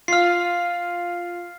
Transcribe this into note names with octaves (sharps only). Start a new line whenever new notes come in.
F4 F5 F6 C7